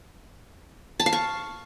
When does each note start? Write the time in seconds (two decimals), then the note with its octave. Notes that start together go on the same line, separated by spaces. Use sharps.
1.00 A5
1.06 F5
1.13 C#6